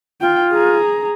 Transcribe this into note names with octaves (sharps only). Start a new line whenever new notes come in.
F4 G5
G#4 A#5